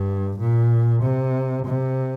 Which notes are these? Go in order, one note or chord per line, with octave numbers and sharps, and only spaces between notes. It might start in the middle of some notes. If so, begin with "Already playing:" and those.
Already playing: G2
A#2
C3
C3